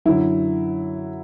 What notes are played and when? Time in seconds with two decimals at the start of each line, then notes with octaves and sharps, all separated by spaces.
0.05 F#2 D3 F#3 E4